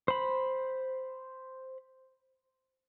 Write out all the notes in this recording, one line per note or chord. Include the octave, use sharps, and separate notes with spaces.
C5 B5